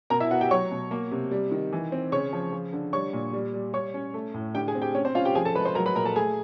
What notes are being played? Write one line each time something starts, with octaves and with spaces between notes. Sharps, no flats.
B2 A#4 A#5
E4 E5
B3 F#4 F#5
G4 G5
F#3 C#5 C#6
B2
A#3
C3
G3
D#3
E3
C4
C#3 C#5 C#6
F3
F3
D3
G3 C#5 C#6
A#2
G3
G3
G3 C#5 C#6
C#4
A3
A2
D3 G4 G5
G#4 G#5
C4
G4 G5
C#4 C#5
C4 C5
C#4 F4 F5
G4 G5
F3 G#4 G#5
A4 A5
G#3 B4 B5
C5 C6
F#3 A#4 A#5
B4 B5
A#2 A#4 A#5
A4 A5
A3 G#4 G#5